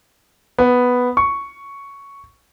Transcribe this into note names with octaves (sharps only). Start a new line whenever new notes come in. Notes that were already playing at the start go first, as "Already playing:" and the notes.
B3
C#6